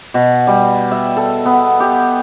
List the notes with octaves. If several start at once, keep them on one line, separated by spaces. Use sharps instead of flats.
B2
G3
E5
A4
B3
G4